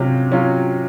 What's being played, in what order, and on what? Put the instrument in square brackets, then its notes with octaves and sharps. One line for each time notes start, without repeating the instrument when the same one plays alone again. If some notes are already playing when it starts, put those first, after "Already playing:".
Already playing: [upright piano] C3 F#3 C#4 F4
F#3 C#4 F4